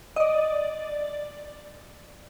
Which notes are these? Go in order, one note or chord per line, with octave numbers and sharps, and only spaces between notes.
D#5
D5